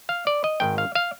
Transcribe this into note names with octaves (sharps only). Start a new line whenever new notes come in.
F5
D5
D#5
G#1 G#2 D#3 G5
F5
F5